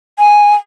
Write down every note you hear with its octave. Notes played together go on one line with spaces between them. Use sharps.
G#5